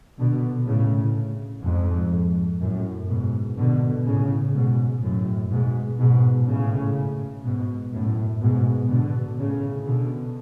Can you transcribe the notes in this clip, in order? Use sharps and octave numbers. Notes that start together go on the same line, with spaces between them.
B2 D3
A2 C#3
F2 G#2
F#2 A2
G#2 B2
B2 D3
A2 C#3
G#2 B2
F#2 A2
G#2 B2
G#2 B2
A2 C#3
G#2 B2
F#2 A2
G#2 B2
B2 D3
A2 C#3
B2 D3